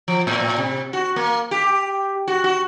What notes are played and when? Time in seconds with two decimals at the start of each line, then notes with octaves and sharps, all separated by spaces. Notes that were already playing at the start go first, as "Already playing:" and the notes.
0.08 F3
0.27 A2
0.58 C3
0.93 F#4
1.16 A#3
1.51 G4
2.28 F#4
2.44 F#4